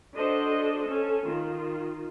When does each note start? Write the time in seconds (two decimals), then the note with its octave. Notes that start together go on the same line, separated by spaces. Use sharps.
0.14 D4 F#4 A4 C5 D#5
0.84 C#4 A4
1.26 D#3 F4